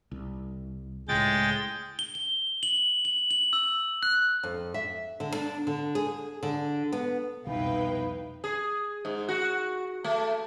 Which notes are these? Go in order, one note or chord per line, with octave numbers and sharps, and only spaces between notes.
C2
C#2 A2 G#3 G5 A6
G7
G7
F#7
F#7
F#7
E6
F#6
F2
E5
D3
D4
D3
G#4
D3
B3
F1 C2 B2 D#4 E4 B4 F5 G5
G#4
G#2
F#4
A3